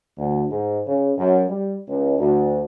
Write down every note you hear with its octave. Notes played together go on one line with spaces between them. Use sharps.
D2
G#2
C#3
F#2
G3
C#2
D2